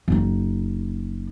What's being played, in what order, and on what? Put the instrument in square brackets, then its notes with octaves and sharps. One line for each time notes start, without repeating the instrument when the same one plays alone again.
[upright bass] F#1 D#4